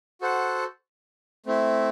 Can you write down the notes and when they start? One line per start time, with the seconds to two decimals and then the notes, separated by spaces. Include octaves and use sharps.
0.21 F#4 A4 C5 F#5
1.46 A3 C4 E4